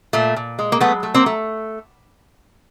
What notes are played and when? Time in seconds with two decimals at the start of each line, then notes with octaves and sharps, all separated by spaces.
0.13 A#2 A3
0.36 A#2
0.59 G#3
0.72 A#3
0.81 F#3 A3 B3
1.03 A3
1.15 A#3 C4
1.26 A3